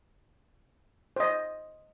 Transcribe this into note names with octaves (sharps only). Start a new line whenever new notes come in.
C5 D#5